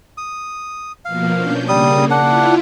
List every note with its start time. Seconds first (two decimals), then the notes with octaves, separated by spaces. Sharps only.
0.18 D#6
1.05 B2 F3 A#3 F5
1.35 C#4 D4 G6
1.68 C#3 G3 A#3 D#6
2.11 D4 E4 F4 F#5